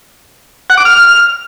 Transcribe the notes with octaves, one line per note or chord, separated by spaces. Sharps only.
F#5
D6
F6